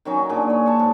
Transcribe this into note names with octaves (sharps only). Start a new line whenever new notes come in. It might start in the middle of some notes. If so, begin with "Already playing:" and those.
D#3 F#3 C#4 D#4
A#2 D4 G#4
C#5
A5 C#6
G#2